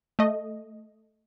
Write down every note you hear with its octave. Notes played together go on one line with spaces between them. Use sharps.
A3 D#5